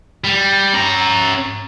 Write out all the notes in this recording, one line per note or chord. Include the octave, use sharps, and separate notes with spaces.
G3
C#4 A#5